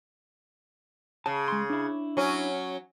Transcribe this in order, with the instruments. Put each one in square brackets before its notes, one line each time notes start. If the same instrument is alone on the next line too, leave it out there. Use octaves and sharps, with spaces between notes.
[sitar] C#3 [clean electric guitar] A5
[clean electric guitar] G#3 C6
D4 E4
[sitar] F#3 C#4